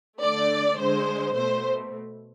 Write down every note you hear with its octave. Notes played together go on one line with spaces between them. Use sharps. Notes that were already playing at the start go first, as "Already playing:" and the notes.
D3 A3 D5
D3 G#3 C5
B2 A3 C5